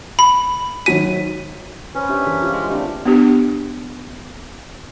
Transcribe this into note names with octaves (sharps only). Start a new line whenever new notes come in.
B5
G#1 F#3 B6 D#7
C#4 B4 C5
D4 G4 E5
E3 G#4 A#4
E3 F4 G4
G#3
A2 A3 C4 D4 G4
B3 D4 G4